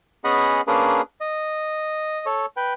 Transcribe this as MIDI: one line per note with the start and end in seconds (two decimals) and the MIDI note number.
0.24 0.61 59
0.24 0.61 61
0.24 0.61 68
0.24 0.61 75
0.24 0.61 78
0.24 0.61 83
0.67 1.01 58
0.67 1.01 61
0.67 1.01 62
0.67 1.01 68
0.67 1.01 70
0.67 1.01 71
1.21 2.26 75
2.26 2.46 69
2.26 2.46 73
2.57 2.74 71
2.57 2.74 79